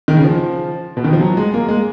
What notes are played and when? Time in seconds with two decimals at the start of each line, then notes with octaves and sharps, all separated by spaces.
0.08 D#3
0.17 C#3
0.24 F3
0.97 B2
1.04 D#3
1.13 F3
1.21 F#3
1.37 G#3
1.54 A#3
1.69 G#3